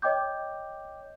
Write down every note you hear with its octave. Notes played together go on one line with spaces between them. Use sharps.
C#5 D#5 G5 D6 G6